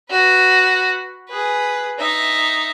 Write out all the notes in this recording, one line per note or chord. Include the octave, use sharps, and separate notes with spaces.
F#4 B4
G#4 B4
D#4 E5